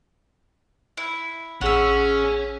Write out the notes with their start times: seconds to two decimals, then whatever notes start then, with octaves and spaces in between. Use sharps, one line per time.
0.97 E4
1.61 A1 C#4 G#4 F#5 E6 B6